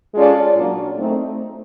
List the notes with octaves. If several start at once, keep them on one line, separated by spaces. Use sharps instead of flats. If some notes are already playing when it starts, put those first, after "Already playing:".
G#3 C#4 F4 A4 D5
A#2 F#3 A#3 D4
A3 C4 D#4